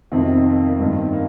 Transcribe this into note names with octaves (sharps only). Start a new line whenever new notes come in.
F2 C3 D#3 C4
A#3
A#3
G2 D#3 C4
A#3